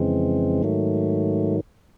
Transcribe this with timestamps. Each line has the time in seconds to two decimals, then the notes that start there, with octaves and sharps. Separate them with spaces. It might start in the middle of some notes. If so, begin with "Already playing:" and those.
Already playing: F2 C#3 E3 G#3 C4
0.63 G#2 D#3 F#3 A3